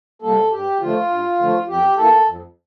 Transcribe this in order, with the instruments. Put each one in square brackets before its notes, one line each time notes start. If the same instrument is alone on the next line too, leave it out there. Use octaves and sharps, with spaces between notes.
[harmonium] C3 G3 A#3 A4
G2 G4
D3 F3 A3 F4
G2
D3 F3 A3
F2 G4
E3 A#3 A4
F2